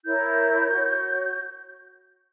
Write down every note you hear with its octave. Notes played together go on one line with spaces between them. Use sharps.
E4 A#4 C#5 G6
F#4 C#5